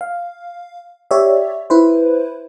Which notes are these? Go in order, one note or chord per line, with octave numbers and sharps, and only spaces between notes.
F5
G4 C#5 D5 E5
E4 B4 C5